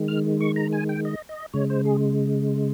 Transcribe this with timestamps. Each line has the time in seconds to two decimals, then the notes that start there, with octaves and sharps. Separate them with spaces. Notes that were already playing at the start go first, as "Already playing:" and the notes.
Already playing: D#3 G#3
0.08 F6
0.41 C#6
0.56 A#5
0.73 G#5
0.89 G5
1.05 D#5
1.29 D#5
1.53 C#3 G#3 C#5
1.70 C5
1.85 G#4